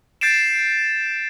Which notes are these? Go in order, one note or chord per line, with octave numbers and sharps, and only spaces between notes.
G6 A6 C7 D7 E7